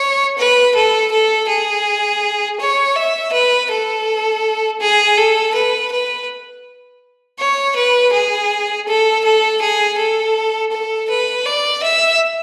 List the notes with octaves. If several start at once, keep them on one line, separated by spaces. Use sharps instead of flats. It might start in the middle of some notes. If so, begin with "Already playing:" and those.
Already playing: C#5
B4
A4
A4
G#4
C#5
E5
B4
A4
G#4
A4
B4
B4
C#5
B4
G#4
A4
A4
G#4
A4
A4
B4
D5
E5